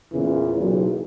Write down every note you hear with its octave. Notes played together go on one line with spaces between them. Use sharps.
E2 A#2 C#3 E3
B1